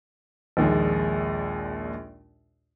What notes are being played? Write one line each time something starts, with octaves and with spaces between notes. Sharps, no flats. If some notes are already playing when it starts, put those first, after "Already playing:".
A#1 D#2 A#2 G#3